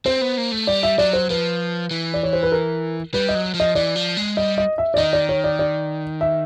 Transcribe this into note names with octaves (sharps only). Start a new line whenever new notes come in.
C4 C5
B3
A#3
A3
G3 D5
E5
F#3 D5
C5
F3 B4
E3
D5
C#5
C5
B4
A#4
G3 B4
D#5
F#3
F3
D#5
E3 D5
F3
G#3
G3 D#5
D#5
E5
D5
D#3 D#5
D5
C#5
D5
D5
E5